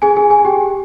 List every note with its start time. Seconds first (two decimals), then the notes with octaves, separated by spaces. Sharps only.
0.02 G#4 G#5
0.16 G#4 G#5
0.30 G#4 G#5
0.45 G4 G5